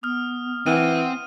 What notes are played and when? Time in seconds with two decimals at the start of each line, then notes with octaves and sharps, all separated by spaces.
0.03 B3 D#6 F6
0.66 E3 C4 F#5 D#7